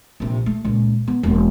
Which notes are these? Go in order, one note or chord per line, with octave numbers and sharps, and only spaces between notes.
A#1 C3
A3
C#2 A#2
B3
E1 A#3